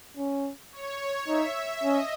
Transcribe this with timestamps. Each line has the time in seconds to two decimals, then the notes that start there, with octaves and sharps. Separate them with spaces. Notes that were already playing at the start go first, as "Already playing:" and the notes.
0.17 C#4
0.72 C#5
1.28 D#4 E5
1.83 C#4 D#5